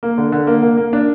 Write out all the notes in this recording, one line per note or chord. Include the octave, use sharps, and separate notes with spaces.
A#3
D3
D3
A#3
A#3
A#3
D4